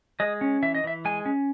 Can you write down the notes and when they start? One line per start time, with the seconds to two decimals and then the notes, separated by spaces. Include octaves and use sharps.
0.20 G#3 D#5
0.41 C#4
0.62 E3 E5
0.75 D#5
0.84 E3 E5
1.05 G#3 G#5
1.26 C#4